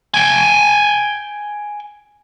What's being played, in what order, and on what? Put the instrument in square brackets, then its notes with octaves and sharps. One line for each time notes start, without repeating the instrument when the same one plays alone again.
[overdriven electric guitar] G5 G#5